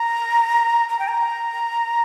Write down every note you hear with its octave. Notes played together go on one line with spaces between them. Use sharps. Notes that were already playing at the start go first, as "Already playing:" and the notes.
Already playing: A#5
A#5
G5
A#5